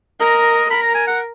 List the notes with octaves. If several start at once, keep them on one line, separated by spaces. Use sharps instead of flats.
A#4 D#5
A#4 B5
A#5
G#5
F#5